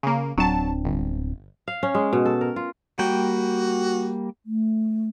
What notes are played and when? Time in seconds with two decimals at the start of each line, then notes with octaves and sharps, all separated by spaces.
0.03 C#3 A#3
0.38 D1 F#3 C4 D4 A5
0.85 G1
1.68 F5
1.83 C#4
1.94 G#3
2.13 B2
2.25 A4
2.41 A#4
2.56 F4
2.99 G3 A#3 F#4 G5
4.44 A3